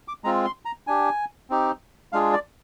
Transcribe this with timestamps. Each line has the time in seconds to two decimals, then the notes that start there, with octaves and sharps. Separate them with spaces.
0.08 D6
0.24 G#3 C4 F4 A#5
0.45 C6
0.65 A#5
0.87 D4 G4 G#5
1.50 C4 D#4 G4
2.13 G#3 D4 F4 G#4 F5
2.33 D5